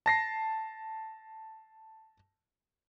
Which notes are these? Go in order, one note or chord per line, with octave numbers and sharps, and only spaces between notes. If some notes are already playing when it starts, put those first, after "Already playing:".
A5 A#6 C7